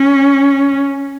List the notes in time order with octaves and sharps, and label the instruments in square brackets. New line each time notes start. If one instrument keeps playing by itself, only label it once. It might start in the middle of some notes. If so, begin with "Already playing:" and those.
Already playing: [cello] C#4